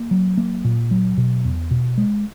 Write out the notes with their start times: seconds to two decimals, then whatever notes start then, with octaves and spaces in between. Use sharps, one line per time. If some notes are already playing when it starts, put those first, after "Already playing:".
Already playing: A#3
0.11 F#3
0.38 A#3
0.65 A#2
0.91 F#3
1.18 B2
1.45 E2
1.71 B2
1.98 G#3